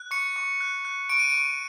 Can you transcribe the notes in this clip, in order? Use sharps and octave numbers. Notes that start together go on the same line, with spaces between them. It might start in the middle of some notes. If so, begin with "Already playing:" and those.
Already playing: F#6
C#6 C#7
C#6
F#6
F#6
C#6 D7
D#7
C#6 D7